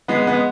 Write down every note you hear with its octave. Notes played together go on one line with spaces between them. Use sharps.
G#3 B3
G#3 B3